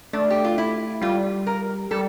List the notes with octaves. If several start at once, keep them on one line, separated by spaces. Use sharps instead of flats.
A3 D4
G4
F4
E4
G3 F4
A#4
G3 A4